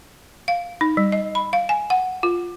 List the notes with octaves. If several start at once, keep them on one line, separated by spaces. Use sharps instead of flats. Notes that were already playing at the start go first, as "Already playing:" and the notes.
F5
D#4
G3
D#5
B5
F5
G#5
F#5
F4